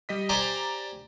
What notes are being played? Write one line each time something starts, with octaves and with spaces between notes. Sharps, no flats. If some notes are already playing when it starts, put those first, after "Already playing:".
G3 D#5 B6
G4 C5 D5 G#5 A#5